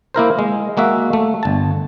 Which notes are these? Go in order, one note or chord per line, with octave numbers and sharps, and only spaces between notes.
A#3 E4 A#4 C5
G#3
G#3 A#3 F#4 E5
A3
G1 A5